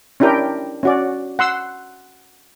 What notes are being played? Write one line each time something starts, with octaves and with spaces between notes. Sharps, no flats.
C#4 D4 E4 G4 A#4 G5
C#4 F#4 D5
F#5 C6 E6